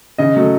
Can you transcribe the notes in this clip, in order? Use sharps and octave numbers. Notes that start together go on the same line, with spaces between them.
C#3 D#5
F#3 A3